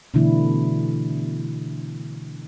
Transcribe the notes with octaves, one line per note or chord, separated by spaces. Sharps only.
B2 D3 E3 A3 D4 E4